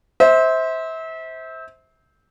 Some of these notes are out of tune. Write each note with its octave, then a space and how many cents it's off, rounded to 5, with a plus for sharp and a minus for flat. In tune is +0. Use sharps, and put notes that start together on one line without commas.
C5 +0 E5 -30